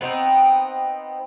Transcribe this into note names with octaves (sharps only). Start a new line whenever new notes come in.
B3 C4 D#4